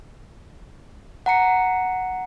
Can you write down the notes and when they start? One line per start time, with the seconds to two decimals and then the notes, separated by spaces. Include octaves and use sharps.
1.26 F#5 A#5 C#7